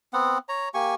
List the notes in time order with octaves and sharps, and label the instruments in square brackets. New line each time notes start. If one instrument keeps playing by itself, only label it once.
[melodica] B3 C4 F#5
C#5 A#5
A#3 G4 G#5 C#6